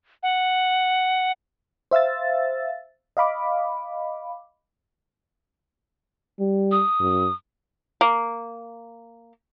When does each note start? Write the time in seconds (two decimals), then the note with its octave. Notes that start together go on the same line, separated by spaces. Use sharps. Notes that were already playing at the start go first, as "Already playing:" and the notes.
0.23 F#5
1.91 C5 E5 F5 E6 A6
3.17 D#5 F5 B5 D6
6.40 G3
6.72 D#6
7.00 F#2
8.01 A#3